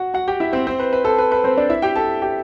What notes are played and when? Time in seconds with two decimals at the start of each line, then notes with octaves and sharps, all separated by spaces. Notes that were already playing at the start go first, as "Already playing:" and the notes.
Already playing: F#4 F#5
0.14 F#4 F#5
0.28 G4 G5
0.40 E4 E5
0.53 C4 C5
0.67 C4 C5
0.80 B4
0.93 B4
1.05 A4
1.19 B4
1.32 B4
1.44 C4 C5
1.57 D4 D5
1.70 E4 E5
1.82 G4 G5
1.96 A4 A5
2.22 G4 G5